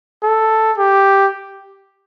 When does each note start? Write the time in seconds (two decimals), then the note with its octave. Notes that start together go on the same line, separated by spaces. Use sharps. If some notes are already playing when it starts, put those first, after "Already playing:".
0.23 A4
0.78 G4